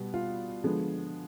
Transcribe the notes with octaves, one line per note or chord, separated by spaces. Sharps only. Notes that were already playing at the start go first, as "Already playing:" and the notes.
Already playing: B2 G3 B3
F4
D3 F3 G#3 B3